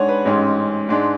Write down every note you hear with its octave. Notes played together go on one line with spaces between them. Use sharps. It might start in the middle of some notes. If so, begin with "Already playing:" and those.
Already playing: G#2 G#3 D4 C#5 F#5 G#5
B4
A1 G#2 G#3 C#4
G#2 G#3 D4